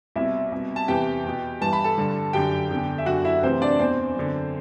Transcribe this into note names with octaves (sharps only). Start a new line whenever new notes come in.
C2 B2 E4 E5
C2 B2
A5
E2 C3 E3 G4 G5
E2 B2
G2 E3 A5
B5
A4 A5
G2 D3
F#2 D3 G4 G5
E2 D3
E5
F#2 D3 F#4 F#5
E4 E5
D2 C3 E3 C4 C5
D4 D5
E2 B2 C4 C5
F#2 D3